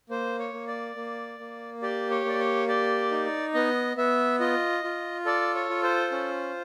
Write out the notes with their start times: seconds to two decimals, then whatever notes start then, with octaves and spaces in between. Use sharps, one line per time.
0.10 A#3 C5
0.39 C#5
0.54 A#3
0.67 D5
0.96 A#3
1.39 A#3
1.82 G4 D5
2.10 C#5
2.25 A#3 D5
2.39 C#5
2.68 G4 D5
3.11 D#4
3.54 B3 D#5
3.97 B3 E5
4.40 F4 D#5
4.84 F4
5.25 A4 D5
5.55 C#5
5.70 F4
5.83 C5
6.12 C#4